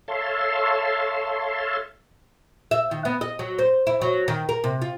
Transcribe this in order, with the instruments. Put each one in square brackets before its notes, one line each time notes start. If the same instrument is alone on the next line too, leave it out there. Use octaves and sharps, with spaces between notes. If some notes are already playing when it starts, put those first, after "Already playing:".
[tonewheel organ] A4 C#5 E5 F5 A5 C6
[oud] E5
D#3
B3
D#5
F#3
C5
E4
F#3
D#3
A#4
C3
F4